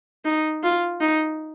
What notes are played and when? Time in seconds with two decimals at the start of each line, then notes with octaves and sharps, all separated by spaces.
0.25 D#4
0.63 F4
1.01 D#4